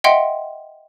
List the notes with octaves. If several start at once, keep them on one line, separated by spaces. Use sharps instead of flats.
D#5 E5 F#5 G5 C6